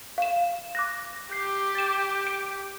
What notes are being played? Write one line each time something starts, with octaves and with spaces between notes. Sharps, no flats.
F5 E7
D6 F#6 A#6
G4 G6 C7
A6 E7
D7